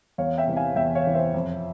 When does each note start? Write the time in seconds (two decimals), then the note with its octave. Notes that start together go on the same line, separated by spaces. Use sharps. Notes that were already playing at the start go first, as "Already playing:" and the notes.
0.18 E2 C#5 F5
0.38 E5 G5
0.47 C3 E3
0.57 F5 G#5
0.76 E2 E5 G5
0.95 C#5 F5
1.05 C3 E3
1.14 C5 E5
1.34 F2